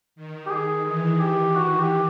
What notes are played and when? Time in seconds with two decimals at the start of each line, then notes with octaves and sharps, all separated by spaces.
0.16 D#3
0.46 G4
0.51 G#4
0.86 E3 G#4
1.20 G4
1.55 F#4
1.79 G4